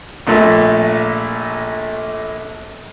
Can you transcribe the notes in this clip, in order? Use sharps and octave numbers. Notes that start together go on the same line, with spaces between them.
A#1 A#2 A3